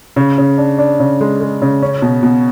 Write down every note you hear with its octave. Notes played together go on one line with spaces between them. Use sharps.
C#3
C#3
D4
D4
C#3
G#3
G#3
C#3
C#4
B2
B2